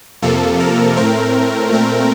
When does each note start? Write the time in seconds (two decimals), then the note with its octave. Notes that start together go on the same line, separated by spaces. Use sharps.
0.22 F2 C3 F3 A#3 A4
0.60 A#4
0.97 A2 A3 C4 A#4
1.69 A#2 A3 C4